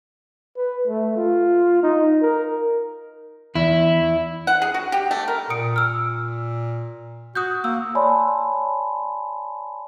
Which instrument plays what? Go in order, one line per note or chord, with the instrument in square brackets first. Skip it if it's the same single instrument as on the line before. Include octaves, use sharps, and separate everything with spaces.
[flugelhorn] B4
A3
F4
D#4
A#4
[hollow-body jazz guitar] E2 [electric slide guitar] E4
[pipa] F#5
G#4
F#4
G4
A3
A#4
[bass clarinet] A#2 [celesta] D#6 C#7 D7
[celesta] E6 F6
[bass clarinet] F#4 [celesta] D#6 F#6 G6
[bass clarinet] A#3 [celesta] E6
[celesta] C#5 D5 G#5 A5 B5 C6